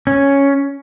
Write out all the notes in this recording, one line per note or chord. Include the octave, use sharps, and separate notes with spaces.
C#4